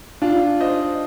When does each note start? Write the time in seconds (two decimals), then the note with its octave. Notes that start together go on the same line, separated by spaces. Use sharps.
0.22 D4 F4
0.60 C5 D#5